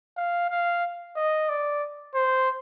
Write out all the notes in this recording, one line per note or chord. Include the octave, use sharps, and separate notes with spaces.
F5
F5
D#5
D5
C5